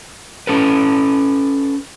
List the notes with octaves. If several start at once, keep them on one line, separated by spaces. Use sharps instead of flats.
C#4 A4 B4